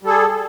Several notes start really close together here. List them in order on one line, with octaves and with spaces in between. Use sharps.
G3 A4 G#4